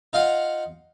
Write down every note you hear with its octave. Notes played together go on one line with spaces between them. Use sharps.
D#4 F4 F5 F#5